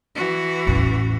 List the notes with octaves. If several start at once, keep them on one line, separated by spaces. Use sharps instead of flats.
E3 F#4
A1 E2